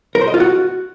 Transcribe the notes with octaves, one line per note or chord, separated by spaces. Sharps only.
A#4
C5
D#5
F4
F#4